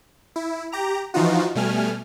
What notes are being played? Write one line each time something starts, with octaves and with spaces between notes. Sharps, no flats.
E4
G4 A#5
E3 F3 D#4 F4 F#4
B2 G3 A3 G#5 F6